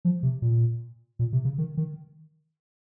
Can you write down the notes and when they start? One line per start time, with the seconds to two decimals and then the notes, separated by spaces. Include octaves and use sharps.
0.05 F3
0.23 C3
0.42 A#2
1.19 A#2
1.33 C3
1.45 C#3
1.58 D#3
1.77 D#3